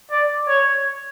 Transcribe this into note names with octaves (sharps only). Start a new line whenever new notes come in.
D5
C#5